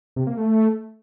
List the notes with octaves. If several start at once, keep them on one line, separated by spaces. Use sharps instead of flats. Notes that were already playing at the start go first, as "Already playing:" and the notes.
C3
A#3
A3